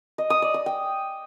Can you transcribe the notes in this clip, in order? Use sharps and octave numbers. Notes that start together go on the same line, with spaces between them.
D#5
D#6
D5
D#6
G5